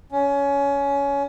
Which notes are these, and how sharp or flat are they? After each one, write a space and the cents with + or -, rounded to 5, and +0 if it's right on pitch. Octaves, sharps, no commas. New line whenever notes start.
C#4 +20